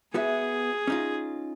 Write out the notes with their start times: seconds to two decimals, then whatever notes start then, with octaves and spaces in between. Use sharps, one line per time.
0.14 B3 F#4 G#4 E5
0.87 C#4 D#4 F4